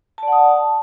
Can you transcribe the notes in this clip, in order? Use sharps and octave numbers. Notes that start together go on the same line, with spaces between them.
D5 F#5 A5 D#6